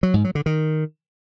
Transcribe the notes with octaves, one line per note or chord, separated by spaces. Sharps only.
F#3
G#2
F#3
D3
D#3